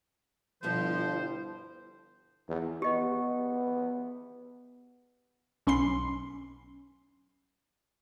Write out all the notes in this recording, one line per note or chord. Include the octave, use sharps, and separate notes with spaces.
G1 B2 F3 G3 E4 C5
E2
B3 G4 D#5
B1 C#4 B5 C6 C7